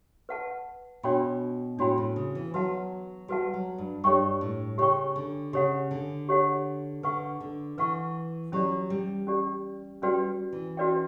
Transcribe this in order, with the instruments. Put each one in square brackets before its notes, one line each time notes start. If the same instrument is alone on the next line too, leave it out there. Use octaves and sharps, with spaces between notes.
[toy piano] B4 F#5 A5
[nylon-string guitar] B2 [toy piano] D4 F#4 C#5 G5 B5
[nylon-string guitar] A2 [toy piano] D4 F#4 C#5 G5 B5
[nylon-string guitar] A2
C#3
E3
[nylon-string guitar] F#3 [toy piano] F#4 B4 F#5 A5
[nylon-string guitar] G3 [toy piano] F#4 B4 F#5 A5
[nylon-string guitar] F#3
G2
[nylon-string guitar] G2 [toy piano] G4 C#5 G5 C#6
[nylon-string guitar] A2
[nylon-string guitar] C#3 [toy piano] G4 C#5 G5 C#6
[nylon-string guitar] D3
[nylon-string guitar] C#3 [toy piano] G4 C#5 F#5
[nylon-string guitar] D3
[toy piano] G4 C#5 F#5
[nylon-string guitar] D3 [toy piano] B4 F#5 C#6
[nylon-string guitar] D3
[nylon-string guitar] E3 [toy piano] B4 F#5 C#6
[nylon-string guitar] F#3 [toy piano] C#4 G4 D5
[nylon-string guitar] G3
[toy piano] C#4 G4 D5
[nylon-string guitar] G3 [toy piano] C#4 F#4 B4 D5 G5
[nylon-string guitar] E3
[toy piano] C#4 F#4 B4 D5 G5